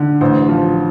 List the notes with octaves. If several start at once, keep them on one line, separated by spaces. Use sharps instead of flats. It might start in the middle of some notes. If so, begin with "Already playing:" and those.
Already playing: D3
A1 C5
F3